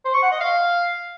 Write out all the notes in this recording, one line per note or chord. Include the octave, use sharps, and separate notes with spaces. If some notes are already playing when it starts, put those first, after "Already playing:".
C5
C#6
F#5
D#5
F5